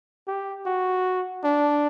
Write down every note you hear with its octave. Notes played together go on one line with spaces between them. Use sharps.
G4
F#4
D4